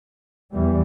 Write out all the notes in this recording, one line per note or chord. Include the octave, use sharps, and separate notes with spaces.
E2 E3 G3